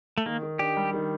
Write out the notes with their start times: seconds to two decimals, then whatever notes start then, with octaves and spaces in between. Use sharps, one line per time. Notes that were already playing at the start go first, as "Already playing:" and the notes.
0.18 A3
0.26 D#3 A#3
0.42 D#3
0.59 D4 G4
0.77 G3
0.93 D#3